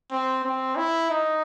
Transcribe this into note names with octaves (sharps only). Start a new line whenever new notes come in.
C4
C4
E4
D#4